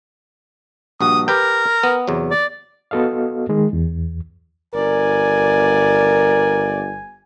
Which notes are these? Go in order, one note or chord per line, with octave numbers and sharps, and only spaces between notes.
A#1 G2 F#4 D#6
G4 A#4 B4 G5
B3
E2 C3 F#3
D5
B3 F#4 A4 D#5 F5
D#3 G#3
E2
G1 A#4 D5 G#5